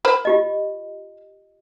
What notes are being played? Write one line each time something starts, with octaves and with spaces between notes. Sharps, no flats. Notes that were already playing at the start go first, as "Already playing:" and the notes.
A#4 C5 B5
F4 G4 D#5